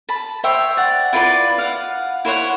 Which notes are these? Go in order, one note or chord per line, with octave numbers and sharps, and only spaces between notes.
A5 B5
C5 C#5 E5 G5
D5 F#5
E4 F4 B4 D5
F5 F#5
E4 C5 C#5 F#5